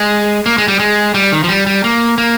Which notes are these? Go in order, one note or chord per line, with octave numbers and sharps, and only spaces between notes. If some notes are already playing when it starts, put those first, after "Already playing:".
Already playing: G#3
A#3
G#3
G3
G#3
G3
D#3
F3
G3
G3
A#3
A#3